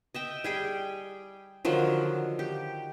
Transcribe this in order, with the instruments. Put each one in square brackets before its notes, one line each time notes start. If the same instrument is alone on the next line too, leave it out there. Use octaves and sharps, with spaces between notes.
[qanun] D#5 E5 G5
G3 G#4 G5
D3 D#3 F3 F#3
G4